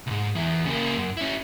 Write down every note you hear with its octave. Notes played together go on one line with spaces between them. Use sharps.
C2 G#2
E2 E3
C#3 A#3
F#2
C#4 E4